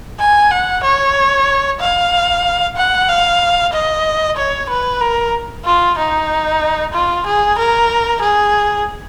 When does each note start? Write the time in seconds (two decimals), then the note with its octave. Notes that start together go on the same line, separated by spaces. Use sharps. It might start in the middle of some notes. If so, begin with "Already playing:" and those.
0.20 G#5
0.51 F#5
0.83 C#5
1.80 F5
2.77 F#5
3.09 F5
3.73 D#5
4.37 C#5
4.70 B4
5.01 A#4
5.65 F4
5.98 D#4
6.93 F4
7.26 G#4
7.58 A#4
8.22 G#4